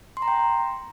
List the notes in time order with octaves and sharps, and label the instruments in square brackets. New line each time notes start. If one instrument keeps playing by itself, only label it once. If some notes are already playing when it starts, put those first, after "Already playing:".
[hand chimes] C6
A#5
G5